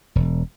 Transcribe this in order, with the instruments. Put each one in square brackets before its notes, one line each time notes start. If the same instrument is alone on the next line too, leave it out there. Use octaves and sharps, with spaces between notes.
[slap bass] E1